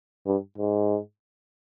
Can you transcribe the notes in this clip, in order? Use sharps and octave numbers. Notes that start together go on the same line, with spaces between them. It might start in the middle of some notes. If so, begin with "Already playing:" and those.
G2
G#2